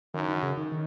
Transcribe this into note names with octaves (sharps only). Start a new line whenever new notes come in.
F#2 D#3
D#3
C#3
D#3
D#3